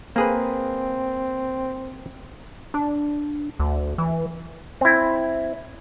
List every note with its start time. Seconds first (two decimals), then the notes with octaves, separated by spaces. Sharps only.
0.16 A#3 C4 G#4 B4
2.74 D4
3.59 D2
3.98 E3
4.81 C4 E4